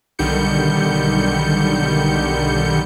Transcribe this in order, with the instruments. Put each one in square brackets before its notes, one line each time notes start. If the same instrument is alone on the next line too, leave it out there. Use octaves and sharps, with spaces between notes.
[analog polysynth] B1 D3 D#3 G3 G6 C#7